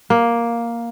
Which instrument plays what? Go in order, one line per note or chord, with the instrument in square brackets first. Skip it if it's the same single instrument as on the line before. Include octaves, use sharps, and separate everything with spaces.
[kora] A#3